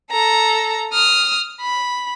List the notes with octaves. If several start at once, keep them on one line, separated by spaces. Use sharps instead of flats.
A4 A#5
D#6 F6
B5